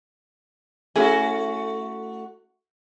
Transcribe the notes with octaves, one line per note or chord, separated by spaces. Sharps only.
A3 C#4 E4 F#4 G#4